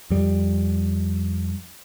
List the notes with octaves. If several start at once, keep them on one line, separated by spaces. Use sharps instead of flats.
F2 G3